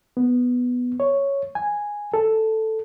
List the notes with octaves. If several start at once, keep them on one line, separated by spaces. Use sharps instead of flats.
B3
C#5
G#5
A4